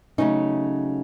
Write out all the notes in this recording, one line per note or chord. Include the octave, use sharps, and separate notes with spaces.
C#3 F#3 A3 C#4 D#4